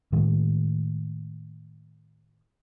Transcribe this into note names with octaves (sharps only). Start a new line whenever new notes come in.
A2 D#3 G#3